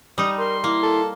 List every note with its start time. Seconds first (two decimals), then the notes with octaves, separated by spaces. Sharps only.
0.18 G3 D#4 D#6
0.38 A#4 C6
0.64 A#3 E4
0.83 A4